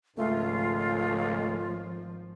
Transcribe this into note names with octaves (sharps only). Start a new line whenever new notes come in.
G#1 C#2 F3 A3 F4